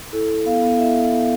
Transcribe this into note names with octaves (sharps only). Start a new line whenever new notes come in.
E4 A4
E4
B3 F5
B3
E4 E5
E4
B3